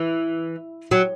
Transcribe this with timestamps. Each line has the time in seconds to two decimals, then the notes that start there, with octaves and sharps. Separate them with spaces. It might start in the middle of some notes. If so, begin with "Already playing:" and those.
Already playing: E3
0.91 F#3